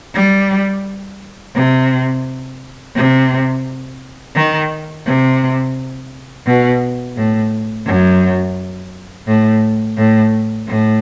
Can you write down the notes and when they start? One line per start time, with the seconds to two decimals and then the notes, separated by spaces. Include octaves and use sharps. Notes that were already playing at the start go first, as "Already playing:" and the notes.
0.14 G3
1.55 C3
2.95 C3
4.35 D#3
5.06 C3
6.46 B2
7.16 A2
7.86 F#2
9.27 A2
9.97 A2
10.68 A2